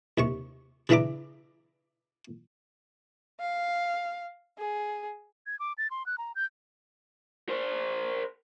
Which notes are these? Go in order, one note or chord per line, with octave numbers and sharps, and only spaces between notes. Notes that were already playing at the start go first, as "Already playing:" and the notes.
D#2 C3 C#6
C#3 E3 D4 E5 A#5 D6
F5
G#4
G#6
D6
A6
C6
F#6
A#5
G6
A#4 C5